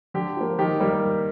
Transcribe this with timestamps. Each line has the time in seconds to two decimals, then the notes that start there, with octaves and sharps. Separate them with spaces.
0.14 D3 G4
0.37 F3 A#3
0.58 D#3 G4
0.80 G3 A#3